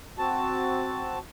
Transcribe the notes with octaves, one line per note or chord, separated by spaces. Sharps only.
C4 F#4 A5